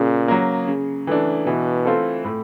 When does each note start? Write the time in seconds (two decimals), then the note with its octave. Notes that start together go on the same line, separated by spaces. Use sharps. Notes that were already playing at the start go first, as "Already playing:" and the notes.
Already playing: A#2 C#3
0.28 F#3 A#3
0.67 C#3
1.07 E3 A3 D4
1.45 B2 E3
1.85 A3 C4 F4 A4
2.25 A2